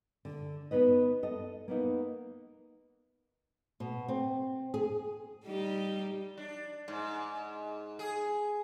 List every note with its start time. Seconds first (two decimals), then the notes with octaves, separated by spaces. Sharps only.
0.25 D3
0.71 B3 D#4 B4 D#5
1.23 A4 D#5
1.68 A#3 B3 D#4
3.80 B2
4.08 C4
4.74 G#4
5.45 G3 D#4 G4
6.37 D4
6.88 G#2
7.99 G#4